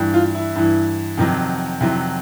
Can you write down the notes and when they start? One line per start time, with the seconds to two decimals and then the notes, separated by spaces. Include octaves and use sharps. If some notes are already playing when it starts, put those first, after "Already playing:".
Already playing: G2 E3
0.14 F4
0.35 E4
0.55 G2 E3
1.18 F2 C3 D#3 F#3
1.81 F2 C3 D#3 F#3 E4